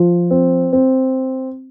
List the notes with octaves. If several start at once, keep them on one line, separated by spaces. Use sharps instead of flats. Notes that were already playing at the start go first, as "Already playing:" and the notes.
Already playing: F3
C4
C4